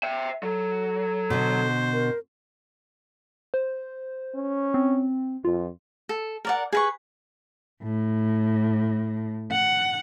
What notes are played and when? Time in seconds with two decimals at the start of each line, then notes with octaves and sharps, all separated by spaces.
0.03 E5 G5
0.43 F#3 A4
1.30 B2 D3 C5
1.93 A#4
3.54 C5
4.35 C#4
4.74 C4
5.45 F2 F4
6.09 A4
6.45 A#4 D5 F#5
6.72 G#4 B4 C#6
7.84 A2
9.52 F#5